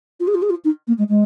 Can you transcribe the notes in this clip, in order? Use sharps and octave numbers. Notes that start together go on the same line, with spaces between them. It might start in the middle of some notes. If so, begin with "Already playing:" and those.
F4
G#4
F4
G#4
F4
D#4
A#3
G#3
G#3